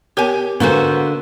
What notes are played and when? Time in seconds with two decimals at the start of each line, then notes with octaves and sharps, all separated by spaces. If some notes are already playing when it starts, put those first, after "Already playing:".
0.17 B3 G4 A#4 C#5 G#5
0.60 D3 A#3 B3 F#4 B4 C5 G#5